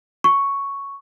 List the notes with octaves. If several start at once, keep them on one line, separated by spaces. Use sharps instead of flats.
C#6